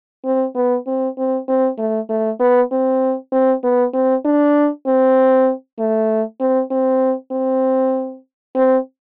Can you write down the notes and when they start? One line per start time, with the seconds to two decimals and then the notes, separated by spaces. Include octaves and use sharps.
0.25 C4
0.55 B3
0.87 C4
1.18 C4
1.48 C4
1.78 A3
2.09 A3
2.40 B3
2.72 C4
3.32 C4
3.64 B3
3.94 C4
4.25 D4
4.87 C4
5.79 A3
6.40 C4
6.71 C4
7.32 C4
8.56 C4